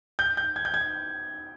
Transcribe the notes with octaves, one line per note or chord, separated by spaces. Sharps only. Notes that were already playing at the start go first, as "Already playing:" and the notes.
G6
G6
G#6
G6
G#6